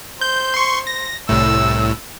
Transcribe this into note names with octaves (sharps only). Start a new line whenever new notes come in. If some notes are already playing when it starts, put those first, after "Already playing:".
C5 G6
C6 C#6
A#6
C2 A2 E6